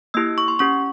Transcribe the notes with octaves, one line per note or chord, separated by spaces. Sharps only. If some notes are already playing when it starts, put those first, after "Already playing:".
A#3 E4 G4 E6
C#6
C6
C#4 G4 C#6